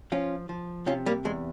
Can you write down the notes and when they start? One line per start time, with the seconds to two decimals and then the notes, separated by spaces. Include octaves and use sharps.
0.12 F3 C#4 F4
0.49 F3
0.86 C3 C#4 F4
1.06 G3 A#3
1.25 E2 G#3